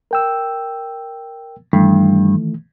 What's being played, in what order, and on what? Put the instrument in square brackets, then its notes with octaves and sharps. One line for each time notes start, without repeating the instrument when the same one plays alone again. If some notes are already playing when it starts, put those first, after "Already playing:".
[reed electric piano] A#4 G5 E6
[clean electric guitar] G2 [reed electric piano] D#3 E3 A3